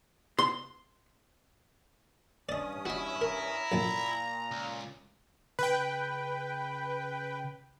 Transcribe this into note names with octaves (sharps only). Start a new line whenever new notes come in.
C6
G2 C#4 D5 D#5 D#6
E4 F#4 D#5
A#4 A#5
A#1 F#2 A#2 A4
C#2
C#3 B4 G5